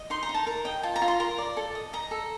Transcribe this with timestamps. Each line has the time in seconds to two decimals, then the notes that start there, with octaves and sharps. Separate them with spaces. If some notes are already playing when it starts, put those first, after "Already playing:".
Already playing: D#5
0.10 D#4 C6
0.23 A#5
0.29 D#4
0.34 A5
0.46 A#4 A#5
0.65 D#5 G5
0.83 F4 A5
0.96 A#5
1.02 F4
1.08 C6
1.20 A#4 A#5
1.38 D5
1.57 A4
1.75 D#5
1.93 D#5 A#5
2.11 A4